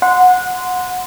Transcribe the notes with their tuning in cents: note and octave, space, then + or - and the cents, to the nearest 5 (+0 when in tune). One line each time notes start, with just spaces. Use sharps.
F#5 -20 C6 -15